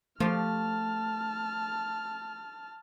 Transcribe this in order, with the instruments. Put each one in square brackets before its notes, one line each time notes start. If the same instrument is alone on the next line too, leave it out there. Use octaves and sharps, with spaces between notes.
[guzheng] F3 G4 [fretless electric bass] A3 [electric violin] A5 F6